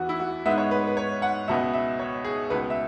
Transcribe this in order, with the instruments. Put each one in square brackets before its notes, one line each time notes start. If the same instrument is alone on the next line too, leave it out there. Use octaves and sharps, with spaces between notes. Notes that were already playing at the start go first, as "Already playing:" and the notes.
Already playing: [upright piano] E2 E3 B3 F#4
E4
F#4
G#2 G#3 B3 E5
C#5
B4
B4
C#5
F#5
C#2 B2 B3 E5
E5
C#5
G#4
C#2 B2 B3 B4
E5